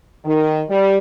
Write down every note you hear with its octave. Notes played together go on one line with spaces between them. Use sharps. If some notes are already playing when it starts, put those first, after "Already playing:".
D#3
G3